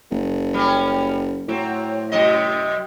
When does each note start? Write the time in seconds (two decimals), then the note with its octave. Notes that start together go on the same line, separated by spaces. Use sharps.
0.11 F#1
0.54 G3 C#4
1.48 A2 F#3 C4
2.12 F#2 C3 D#5